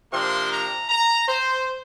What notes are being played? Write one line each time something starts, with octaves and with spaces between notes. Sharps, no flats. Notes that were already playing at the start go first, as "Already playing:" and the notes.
C3 F3 A#3 D4 C6
A#5
A#5
C5